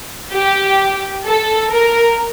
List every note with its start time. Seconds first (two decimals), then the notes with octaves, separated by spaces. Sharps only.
0.33 G4
1.25 A4
1.70 A#4